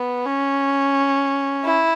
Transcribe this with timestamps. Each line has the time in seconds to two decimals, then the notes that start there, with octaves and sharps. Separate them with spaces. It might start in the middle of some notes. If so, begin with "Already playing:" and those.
Already playing: B3
0.25 C#4
1.64 E4